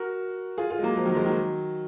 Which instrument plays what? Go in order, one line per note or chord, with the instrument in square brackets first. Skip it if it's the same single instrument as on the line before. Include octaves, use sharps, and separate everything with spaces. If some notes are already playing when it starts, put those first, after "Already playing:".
Already playing: [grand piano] F#4 A#4
F4 G#4
F4 G#4
G#3
F#3 A#3
F3 G#3
D#3 F#3
F3 G#3
D#3 F#3